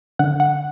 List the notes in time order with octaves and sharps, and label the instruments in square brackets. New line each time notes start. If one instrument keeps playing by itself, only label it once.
[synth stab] D3 F#5
F#5